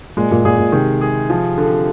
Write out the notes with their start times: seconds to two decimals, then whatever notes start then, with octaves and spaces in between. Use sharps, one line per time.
0.17 A#2 G#3
0.31 A#2
0.45 A#2 G#4
0.58 A#2
0.72 C3 D#3
1.01 G#4
1.30 F3
1.58 D3